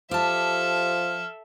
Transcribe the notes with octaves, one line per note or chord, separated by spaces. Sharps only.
F3 G4 A4 E5 A5 F6